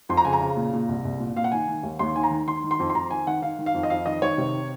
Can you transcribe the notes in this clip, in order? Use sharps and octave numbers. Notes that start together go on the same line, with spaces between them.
F2 C6
A#5
C#3 G#5
A#5
C#3
A#2
A#2
C2
C2
A#2
A#2 F5
F#5
D#3 G#5
D#3
D#2
D#2 C6
D#3 G#5
A#5
D#3
D#3 C6
D#3
C6
F2
C6
F2 A#5
D#3 G#5
D#3 F#5
D#3 F5
D#3
F5
F2
D#5
F2 F5
D#3 D#5
D#3 C#5
C3